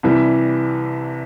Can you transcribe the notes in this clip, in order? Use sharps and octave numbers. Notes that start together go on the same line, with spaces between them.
C2 C3 E3 G3 E4